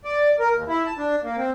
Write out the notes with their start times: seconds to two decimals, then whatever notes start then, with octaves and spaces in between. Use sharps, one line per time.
0.05 D5
0.39 A#4
0.54 D#2
0.68 E4
0.86 A5
0.98 D4
1.23 A#3
1.37 C4